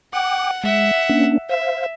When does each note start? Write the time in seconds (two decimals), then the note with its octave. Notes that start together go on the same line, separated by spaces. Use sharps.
0.13 F#5 G5 D6
0.64 G#3 E5 F#5
1.10 A#3 C#4 D4
1.49 C5 E5 F5